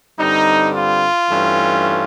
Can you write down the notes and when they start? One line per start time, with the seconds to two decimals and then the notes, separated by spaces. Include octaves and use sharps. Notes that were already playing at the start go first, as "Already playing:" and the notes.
0.19 G2 D3 G3 C4 D#4
0.75 F4
1.29 G2 E3 A3 C#4